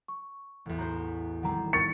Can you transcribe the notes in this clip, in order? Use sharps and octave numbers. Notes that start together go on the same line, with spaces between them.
C#6
A1 E2
F#4 C5 A#5
D#3 G3 C4 F#5 A#5
A#4 C#6 A6 C#7